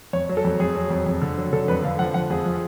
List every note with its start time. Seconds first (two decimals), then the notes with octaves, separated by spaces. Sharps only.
0.13 F2 C#5
0.29 F#3
0.37 A4
0.45 F2
0.60 F2 G#4
0.75 F#3
0.90 F2
1.06 F2
1.22 D3
1.38 F#3
1.53 D3 A4
1.68 F2 B4
1.83 D3 F5
1.99 F3 F#5
2.14 F3 F#5
2.30 F2 G#4
2.46 F3